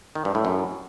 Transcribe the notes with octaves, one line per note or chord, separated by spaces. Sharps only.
D#3
G2
A2
F#2